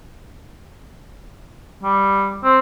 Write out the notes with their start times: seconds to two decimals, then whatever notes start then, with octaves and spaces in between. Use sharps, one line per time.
1.83 G3
2.44 C4